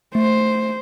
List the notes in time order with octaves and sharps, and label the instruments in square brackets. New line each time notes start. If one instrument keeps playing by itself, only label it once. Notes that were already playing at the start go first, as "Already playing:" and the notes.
[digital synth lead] A3 [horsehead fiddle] C5